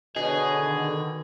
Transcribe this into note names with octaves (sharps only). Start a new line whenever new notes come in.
B2 D3 D4 G#4 C#5 D#5
D#3